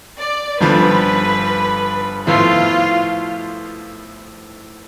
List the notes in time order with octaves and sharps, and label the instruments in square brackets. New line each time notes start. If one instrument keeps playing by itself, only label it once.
[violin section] D5
[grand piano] G1 G2 F3 [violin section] B4
[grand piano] A2 F3 B3 E4 A4 [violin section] F4